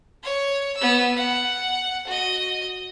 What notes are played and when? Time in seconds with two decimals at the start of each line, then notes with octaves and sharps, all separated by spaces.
0.23 C#5
0.77 B3 E6
1.16 F#5
2.07 F#4 D#5